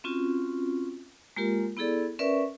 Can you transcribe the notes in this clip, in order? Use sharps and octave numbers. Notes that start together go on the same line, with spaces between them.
C4 C#4 F4 F#4
G#3 A#3 F4 G4 A#4
B3 E4 G#4 A4 D5
C#4 A#4 B4 D5 E5 C#6